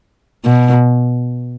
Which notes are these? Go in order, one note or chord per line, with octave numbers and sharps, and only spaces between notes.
B2